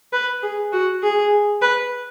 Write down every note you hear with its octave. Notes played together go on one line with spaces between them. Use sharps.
B4
G#4
F#4
G#4
B4